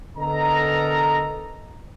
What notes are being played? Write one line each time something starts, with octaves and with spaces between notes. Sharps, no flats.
D3 B3 A4 A#4 D#5 A#5